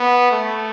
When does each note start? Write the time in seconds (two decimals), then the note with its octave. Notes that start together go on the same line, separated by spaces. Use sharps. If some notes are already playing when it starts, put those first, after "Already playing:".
Already playing: B3
0.32 A3